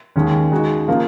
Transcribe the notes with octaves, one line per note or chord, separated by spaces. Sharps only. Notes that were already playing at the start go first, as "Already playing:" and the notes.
D#2 D#3 G#3 C#4
C#3 G#3 D#4 F#4
C#3 F3 A#3 F4